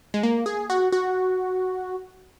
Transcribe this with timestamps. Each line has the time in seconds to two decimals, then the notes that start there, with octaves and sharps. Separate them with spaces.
0.14 G#3
0.23 A#3
0.46 G#4
0.70 F#4
0.92 F#4